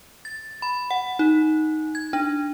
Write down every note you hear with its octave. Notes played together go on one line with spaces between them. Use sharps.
A6
B5
F#5
D#4
G#6
D4